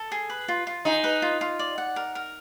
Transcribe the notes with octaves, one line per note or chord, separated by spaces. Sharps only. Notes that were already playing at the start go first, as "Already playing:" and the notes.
Already playing: A4
G#4
B4
F4
F4
D#4 G#4
B4
F4
F4
D5
F#5
A#4
A#4